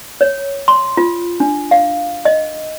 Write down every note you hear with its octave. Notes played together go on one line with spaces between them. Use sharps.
C#5
C6
F4
D4
F5
D#5